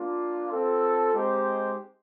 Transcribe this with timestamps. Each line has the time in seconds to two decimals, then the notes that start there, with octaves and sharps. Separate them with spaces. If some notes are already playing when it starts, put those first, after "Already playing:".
Already playing: A#3 D4 F4
0.52 C4 F4 A4
1.13 G#3 C4 D#4 G4 C5